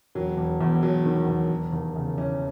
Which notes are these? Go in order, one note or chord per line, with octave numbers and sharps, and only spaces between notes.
E1 F#3
E1
E2
E1 F#3
D#3
E2
E1
D#2
C#3
E3 C#4